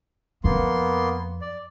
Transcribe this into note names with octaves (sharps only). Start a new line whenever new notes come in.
F2 A#3 B3 C6
D5